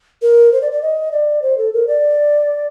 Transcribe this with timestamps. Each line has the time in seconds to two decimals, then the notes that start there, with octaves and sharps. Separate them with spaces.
0.22 A#4
0.52 C5
0.61 D5
0.72 D5
0.82 D#5
1.12 D5
1.42 C5
1.58 A4
1.73 A#4
1.87 D5